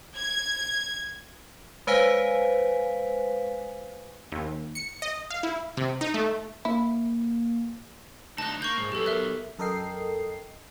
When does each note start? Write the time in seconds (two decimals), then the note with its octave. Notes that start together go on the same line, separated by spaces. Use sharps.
0.17 G#6
1.87 G#3 B4 C5 F5 G#5 B6
4.32 D#2
4.75 C#7
5.02 D#5
5.30 F5
5.43 E4
5.77 C3
6.01 D#4
6.14 A3
6.65 A#3 E4
8.38 D2 D#4 A5 F#6
8.62 A#3 C#6 G6
8.77 G#2
8.92 B1 B2 G4 A4
9.06 A#4 E5 F#6
9.59 F#2 A4 A#4 D#5 G5 C7